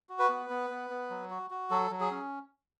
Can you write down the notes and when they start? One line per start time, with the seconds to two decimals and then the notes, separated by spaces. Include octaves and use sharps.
0.09 F#4
0.19 B4
0.29 B3
0.50 B3
0.70 B3
0.90 B3
1.10 F#3
1.30 F#4
1.50 F#4
1.71 F#3 A4
1.91 F#3
2.00 G#4
2.11 C#4